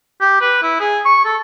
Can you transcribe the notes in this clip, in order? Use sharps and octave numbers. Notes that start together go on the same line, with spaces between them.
G4
B4
E4
G#4
C#6
A4